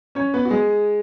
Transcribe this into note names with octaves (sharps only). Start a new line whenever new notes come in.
C#4 C#5
B3 B4
F#4
G#3 G#4